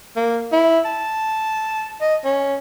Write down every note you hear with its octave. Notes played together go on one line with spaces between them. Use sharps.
A#3
E4
A5
D#5
C#4